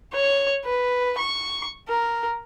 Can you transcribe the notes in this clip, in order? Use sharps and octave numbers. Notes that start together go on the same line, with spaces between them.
C#5
B4
C#6
A#4